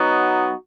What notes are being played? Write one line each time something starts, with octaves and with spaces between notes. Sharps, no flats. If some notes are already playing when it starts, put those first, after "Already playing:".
Already playing: F#3 B3 D#4 F#4